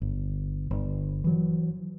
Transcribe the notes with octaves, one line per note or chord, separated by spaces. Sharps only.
G1
G1
E3 F#3